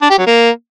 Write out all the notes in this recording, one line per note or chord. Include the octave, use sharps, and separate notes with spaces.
D4
G4
F#3
A#3